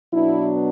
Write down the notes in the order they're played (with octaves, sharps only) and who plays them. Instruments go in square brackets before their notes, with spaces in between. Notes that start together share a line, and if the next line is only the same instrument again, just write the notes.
[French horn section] B2 F#3 B3 D4 E4